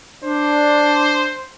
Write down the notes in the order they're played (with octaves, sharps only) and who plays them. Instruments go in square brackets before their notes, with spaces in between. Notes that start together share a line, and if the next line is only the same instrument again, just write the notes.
[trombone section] D4 [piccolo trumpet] C5